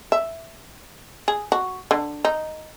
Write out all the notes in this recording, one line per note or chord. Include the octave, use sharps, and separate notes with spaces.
E5
G#4
F#4
D3
D#4